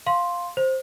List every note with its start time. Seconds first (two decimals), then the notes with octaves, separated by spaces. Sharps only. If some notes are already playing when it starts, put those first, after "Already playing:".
0.07 F5 C6
0.57 C5